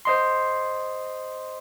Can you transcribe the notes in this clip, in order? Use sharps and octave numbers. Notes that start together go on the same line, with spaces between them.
C5 D#5 C6